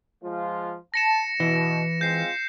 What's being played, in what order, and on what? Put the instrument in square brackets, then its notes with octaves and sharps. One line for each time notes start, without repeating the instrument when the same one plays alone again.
[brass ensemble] F3 G#3 F4
[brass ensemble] A5 [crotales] A#6 C#7 E7
[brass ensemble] B2 [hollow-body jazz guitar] E3
[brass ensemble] G#3 C4 F4 [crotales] G6 C7